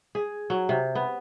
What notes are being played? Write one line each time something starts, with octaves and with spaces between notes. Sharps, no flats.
G#4
F#3
C3
B3